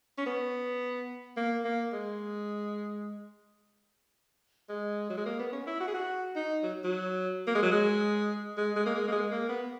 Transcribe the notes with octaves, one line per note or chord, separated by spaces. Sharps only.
C#4
B3
A#3
A#3
G#3
G#3
F#3
G#3
A#3
B3
C#4
E4
F#4
G#4
F#4
D#4
F#3
F#3
A#3
G#3
F#3
G#3
G#3
G#3
A#3
G#3
A#3
G#3
A#3
B3